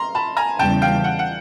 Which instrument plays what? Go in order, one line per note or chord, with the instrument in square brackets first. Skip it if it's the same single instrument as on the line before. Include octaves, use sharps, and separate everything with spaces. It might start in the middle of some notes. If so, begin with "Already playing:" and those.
Already playing: [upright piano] A#5 C6
A5 B5
G#5 A#5
[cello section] E2 C#3 E3 G3 [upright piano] G5 A5
[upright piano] F5 G5
F#5
F#5